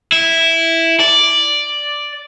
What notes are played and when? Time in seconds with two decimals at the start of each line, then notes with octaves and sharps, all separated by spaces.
0.12 E4
1.00 D5